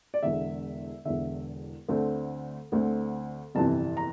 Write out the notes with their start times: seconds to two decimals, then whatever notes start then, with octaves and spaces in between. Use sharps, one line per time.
0.14 D5
0.23 E1 E2 D3 E5
1.05 E1 E2 D3 E5
1.89 D2 D3 A3 C4
2.72 D2 D3 A3 C4
3.55 G1 F2 C3 E3 A5
3.97 A#5